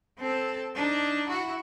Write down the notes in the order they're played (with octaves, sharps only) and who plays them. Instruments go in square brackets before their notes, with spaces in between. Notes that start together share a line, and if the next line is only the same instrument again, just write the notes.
[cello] C4 A4
D4 D#4
E4 F#4